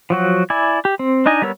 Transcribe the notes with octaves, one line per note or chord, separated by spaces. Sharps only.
F3 F#3 F#4
E4 D5 G#5
G4
C4
D4 D#4 D#5 G#5
G3 B3 A#4 C#5 E6